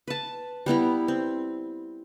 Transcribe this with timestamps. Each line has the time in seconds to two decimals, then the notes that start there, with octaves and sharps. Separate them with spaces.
0.08 B4 A5
0.66 G3 B3 E4 A#5
1.08 C4